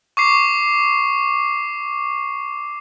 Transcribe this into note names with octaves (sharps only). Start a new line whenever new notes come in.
C#6 D6 C7